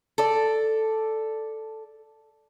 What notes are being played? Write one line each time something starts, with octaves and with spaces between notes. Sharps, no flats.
A4 D5